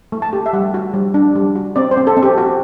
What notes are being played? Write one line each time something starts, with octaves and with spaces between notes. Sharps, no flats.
A3
A5
G4
E5
G3 F#5
F#4
G3
D4
G3
F#4
C4 D5
C5
C4
A4
C4
G4
F#4